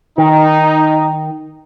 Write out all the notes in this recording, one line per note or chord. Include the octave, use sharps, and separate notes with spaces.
D#3 D#4